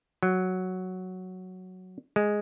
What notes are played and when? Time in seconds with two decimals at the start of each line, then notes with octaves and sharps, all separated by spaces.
0.23 F#3
2.16 G#3